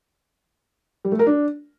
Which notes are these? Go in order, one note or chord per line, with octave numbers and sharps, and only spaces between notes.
G3
A3
A#4
D4